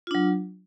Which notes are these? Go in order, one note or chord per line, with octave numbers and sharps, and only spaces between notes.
F#3 D4 F4